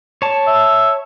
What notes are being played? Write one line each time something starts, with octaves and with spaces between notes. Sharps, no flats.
C#5 A5
E5